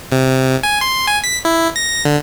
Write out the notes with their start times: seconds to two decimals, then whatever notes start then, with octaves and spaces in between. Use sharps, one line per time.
0.12 C3
0.63 G#5
0.81 C6
1.07 G#5
1.24 B6
1.45 E4
1.76 A#6
2.05 D3